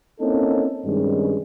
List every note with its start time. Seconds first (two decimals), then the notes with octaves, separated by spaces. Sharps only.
0.20 A#3 C4 C#4 D#4 E4 A4
0.85 G2 C3 D#3 G3 G#3 C#4